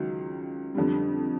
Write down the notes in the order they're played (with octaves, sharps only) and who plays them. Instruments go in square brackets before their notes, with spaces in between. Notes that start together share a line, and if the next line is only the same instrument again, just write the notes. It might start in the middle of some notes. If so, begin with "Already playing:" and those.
Already playing: [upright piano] C#2 D#3 F#3
F2 D3 G3